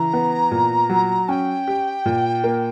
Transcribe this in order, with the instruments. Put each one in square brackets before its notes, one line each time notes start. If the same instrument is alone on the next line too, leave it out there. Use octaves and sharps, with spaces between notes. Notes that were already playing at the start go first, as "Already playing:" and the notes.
Already playing: [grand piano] C#3 E3 [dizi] A#5
[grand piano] B3
A#2
F#3
[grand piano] C#4 [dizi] G5
[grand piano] G4
A#2
A#3